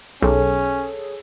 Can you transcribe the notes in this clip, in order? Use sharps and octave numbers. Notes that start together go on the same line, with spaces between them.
B1 C#4 G#4 A4 C#5